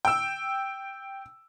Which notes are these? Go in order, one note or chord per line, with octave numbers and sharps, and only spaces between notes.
G5 E6